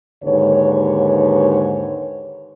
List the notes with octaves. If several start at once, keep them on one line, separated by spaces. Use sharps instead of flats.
D#2 G#2 D3 B4 C#5